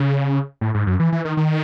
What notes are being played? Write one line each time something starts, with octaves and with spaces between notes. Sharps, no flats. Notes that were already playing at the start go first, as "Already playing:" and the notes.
Already playing: C#3
A2
G#2
F#2
E3
E3
D#3
D#3